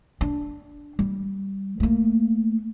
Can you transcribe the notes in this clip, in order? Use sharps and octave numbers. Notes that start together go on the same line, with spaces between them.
D4
G3
A3 A#3